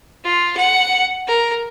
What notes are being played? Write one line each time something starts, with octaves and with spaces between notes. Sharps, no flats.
F4
F#5
A#4